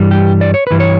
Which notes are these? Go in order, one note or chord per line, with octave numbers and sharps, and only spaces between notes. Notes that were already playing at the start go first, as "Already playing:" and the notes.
Already playing: G2 E3 G3
G4
D5
C#5
G2 E3 G3 B4
C#5